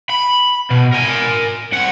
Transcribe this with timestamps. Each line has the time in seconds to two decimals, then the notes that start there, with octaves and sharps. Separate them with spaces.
0.10 B5
0.70 B2
0.93 A#4 G#5
1.72 C2 F#5